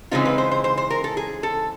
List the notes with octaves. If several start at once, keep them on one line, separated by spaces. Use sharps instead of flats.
C#3 E3 G#3 C4 D#4 F4
B4
C5
C5
C5
C5
A#4
A4
G#4
A4